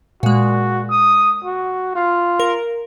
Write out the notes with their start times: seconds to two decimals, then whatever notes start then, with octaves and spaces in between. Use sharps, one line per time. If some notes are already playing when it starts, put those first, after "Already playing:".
0.23 A#2 G#3 F#4
0.90 D#6
1.45 F#4
1.95 F4
2.40 A#4